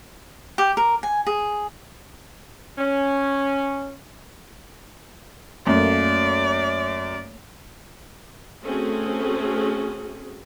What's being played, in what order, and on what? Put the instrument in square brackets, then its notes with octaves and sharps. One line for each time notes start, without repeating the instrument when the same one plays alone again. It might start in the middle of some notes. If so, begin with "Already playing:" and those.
[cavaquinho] G4
A#4
G#5
G#4
[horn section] C#4
[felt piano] F#2 [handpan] A3 A#3 [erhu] D5
[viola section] A3 C4 C#4 F#4 G#4